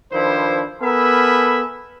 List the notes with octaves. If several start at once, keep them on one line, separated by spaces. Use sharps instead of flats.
D#3 F3 D4 E4 B4 C5
B3 A4 A#4 E5 G#5 B5